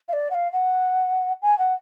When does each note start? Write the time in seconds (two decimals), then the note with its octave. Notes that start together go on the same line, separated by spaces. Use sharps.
0.08 F5
0.13 D5
0.31 F#5
0.34 F5
0.53 F#5
1.42 G#5
1.59 F#5